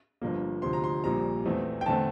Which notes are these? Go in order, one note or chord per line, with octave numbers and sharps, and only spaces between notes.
G1 G2 F3 A#3
D2 C3 F3 C6
A#5
C6
A#1 A#2 G3 C4 A#5
E2 E3 A3 C4
G5
E2 D3 A3 C4 A5